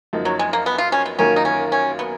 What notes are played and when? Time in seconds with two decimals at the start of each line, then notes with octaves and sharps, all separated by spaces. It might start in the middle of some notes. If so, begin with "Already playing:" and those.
0.13 F#2 F3 A#3 D#4
0.25 F#3
0.39 G#3
0.53 A#3
0.66 B3
0.78 F4
0.92 C#4
1.06 B3
1.19 F#2 D#3 A#3 C#4 F4 A#4
1.36 D#4
1.45 C#4
1.72 C#4
1.99 B3